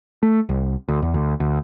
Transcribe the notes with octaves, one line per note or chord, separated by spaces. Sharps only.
A3
C2
D2
E2
D2
D2